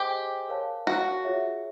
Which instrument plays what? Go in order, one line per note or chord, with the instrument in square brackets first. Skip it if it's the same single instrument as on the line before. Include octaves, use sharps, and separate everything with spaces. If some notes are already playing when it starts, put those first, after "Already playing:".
Already playing: [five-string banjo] G4 [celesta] G#4 C5 D#5 G#5 C6
[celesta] A#4 C#5 F5 A5
[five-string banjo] F#4
[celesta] F4 G#4 C#5 E5